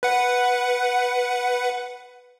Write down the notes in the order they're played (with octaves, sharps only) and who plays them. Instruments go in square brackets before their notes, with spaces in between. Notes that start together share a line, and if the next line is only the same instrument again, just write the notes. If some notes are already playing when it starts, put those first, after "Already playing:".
[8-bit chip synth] B4 F#5